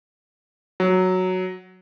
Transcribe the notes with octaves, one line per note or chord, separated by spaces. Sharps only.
F#3